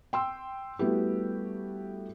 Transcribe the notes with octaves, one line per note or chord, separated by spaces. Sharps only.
G5 C6 E6
G3 A3 B3 E4 F#4 G4